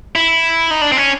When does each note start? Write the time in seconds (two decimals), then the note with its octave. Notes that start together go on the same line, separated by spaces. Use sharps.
0.16 E4
0.71 D#4
0.82 D4
0.92 C4
0.97 C#4